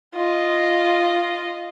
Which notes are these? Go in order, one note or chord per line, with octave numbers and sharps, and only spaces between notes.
F4 D#5